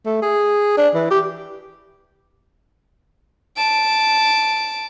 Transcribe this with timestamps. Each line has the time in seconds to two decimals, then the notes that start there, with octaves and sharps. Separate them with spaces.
0.06 A3
0.22 G#4
0.78 D4
0.95 E3
1.11 G4
3.57 A5 D7